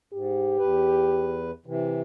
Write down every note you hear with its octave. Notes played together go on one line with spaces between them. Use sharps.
G#2 G4
E2 B4
C3 E3